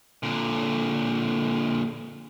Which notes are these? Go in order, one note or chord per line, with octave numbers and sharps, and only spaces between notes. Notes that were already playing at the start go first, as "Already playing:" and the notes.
A#2 D3